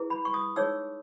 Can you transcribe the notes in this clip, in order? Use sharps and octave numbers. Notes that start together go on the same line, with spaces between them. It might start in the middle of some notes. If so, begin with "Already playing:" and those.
Already playing: E4 G#4 B4
B5
C#6
D#6
D#4 G#4 C#5 E6